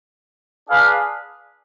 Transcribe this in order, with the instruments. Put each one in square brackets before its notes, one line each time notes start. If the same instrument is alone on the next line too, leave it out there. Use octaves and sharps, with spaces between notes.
[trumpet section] D4 G#4 B4 F5